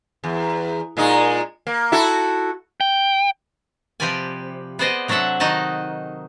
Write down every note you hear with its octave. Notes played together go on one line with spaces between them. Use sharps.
E2
A#2 G#3 D#4
A#3
E4 F#4 A4
G5
C3 F3 G4 B4 D5 G#5
B3 G#4 C5 D5 D#5
C3 F#3 D4 A4 E5 F#5
D#3 D#4 F#4 D#5 A5